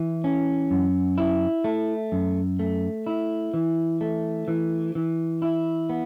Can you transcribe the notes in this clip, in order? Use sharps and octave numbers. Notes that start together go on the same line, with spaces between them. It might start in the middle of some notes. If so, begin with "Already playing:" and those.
Already playing: E3 E4
C#4
F#2
E4
A3
F#2
A3
E4
E3
A3
E3
E3
E4
B3